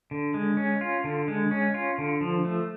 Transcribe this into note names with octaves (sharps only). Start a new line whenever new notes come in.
D3
G#3
C#4
F4
D3
G#3
C#4
F4
D3
F3
A3